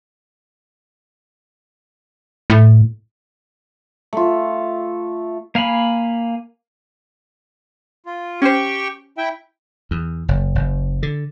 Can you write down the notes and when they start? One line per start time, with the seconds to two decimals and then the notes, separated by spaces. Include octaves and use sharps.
2.50 A2
4.13 A3 F4
5.55 A#3 F5 G#5 B5
8.06 F4
8.42 C#4 G4 C5 G5 C#6
9.18 E4 E5 G5
9.91 E2
10.28 F#1
10.55 F#1
11.03 D3